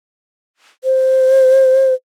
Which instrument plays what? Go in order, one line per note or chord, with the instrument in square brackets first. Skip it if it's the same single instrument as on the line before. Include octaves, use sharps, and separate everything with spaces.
[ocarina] C5